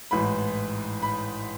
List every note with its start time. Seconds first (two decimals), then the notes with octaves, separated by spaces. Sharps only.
0.11 A1 G#2 E3 B5
1.02 B5